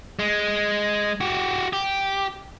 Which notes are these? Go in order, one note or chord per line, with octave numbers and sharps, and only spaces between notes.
G#3
F#4 G4
G4